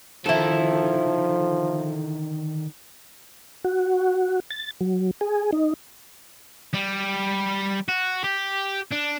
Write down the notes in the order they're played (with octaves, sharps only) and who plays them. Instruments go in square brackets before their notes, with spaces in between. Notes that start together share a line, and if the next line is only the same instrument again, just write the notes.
[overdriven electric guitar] D3 D#3 [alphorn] F3 [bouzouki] E4 A4
[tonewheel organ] F#4
A6
F#3
G#4
D#4
[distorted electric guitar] G3
F#4
G4
D4